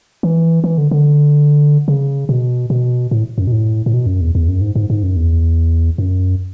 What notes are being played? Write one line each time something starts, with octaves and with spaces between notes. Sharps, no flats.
E3
E3
D3
D3
C#3
B2
B2
A2
F#2
B2
A2
A2
B2
F#2
E2
E2
F#2
G#2
G#2
G#2
F#2
E2
F#2